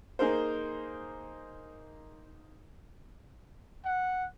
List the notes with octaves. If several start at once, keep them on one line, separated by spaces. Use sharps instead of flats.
A#3 D#4 G#4 A#4 C5
F#5